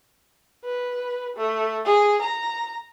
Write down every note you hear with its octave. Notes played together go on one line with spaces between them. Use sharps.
B4
A3
G#4
A#5